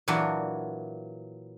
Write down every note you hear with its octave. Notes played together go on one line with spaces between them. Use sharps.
A#2 E3 F#3 D4 F#4